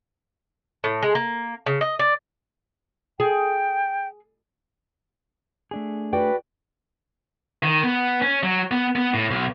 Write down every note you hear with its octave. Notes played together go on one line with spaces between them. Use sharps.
A2
G#3
A#3
C#3
D#5
D5
G#4 G5
A3 D4 G#4
F#4 B4 D5 G5
D#3
B3
C#4
F#3
B3
B3
A2
B1